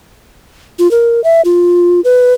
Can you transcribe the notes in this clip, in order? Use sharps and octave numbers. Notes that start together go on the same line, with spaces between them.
F4
A#4
E5
F4
B4